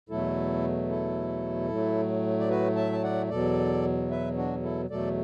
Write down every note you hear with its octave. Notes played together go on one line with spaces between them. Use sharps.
E2 B2 F#3 A3 E4 A4
E4 A4
A2 F#3 A3
D5
F#4 B4
E5 A5
A5
D5 F#5
E2 B2 F#3 A4 D5
B4 E5
D4 F#4
E4 A4
E2 B2 F#3 A3 A4 D5